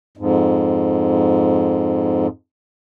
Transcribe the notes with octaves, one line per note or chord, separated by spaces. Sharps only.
F2 G#2